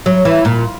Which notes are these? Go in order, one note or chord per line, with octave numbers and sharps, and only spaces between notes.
F#3
E3
A#2